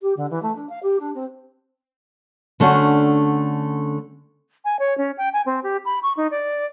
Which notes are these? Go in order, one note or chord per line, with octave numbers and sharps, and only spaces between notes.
G4
D3
E3
A3
D4
F5
G4
D4
C4
D3 A3 C#4 D4 F#4
G#5
C#5
C#4
G5
G#5
C4
G4
B5
C#6
D#4
D5